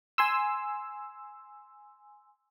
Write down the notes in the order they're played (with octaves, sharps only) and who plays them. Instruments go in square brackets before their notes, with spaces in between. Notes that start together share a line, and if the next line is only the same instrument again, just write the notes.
[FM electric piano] G#5 C6 E6